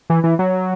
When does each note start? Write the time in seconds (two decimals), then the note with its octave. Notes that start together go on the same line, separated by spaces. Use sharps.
0.10 E3
0.24 E3
0.39 F#3